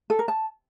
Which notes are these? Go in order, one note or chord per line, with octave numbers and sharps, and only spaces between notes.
A4
A#4
A5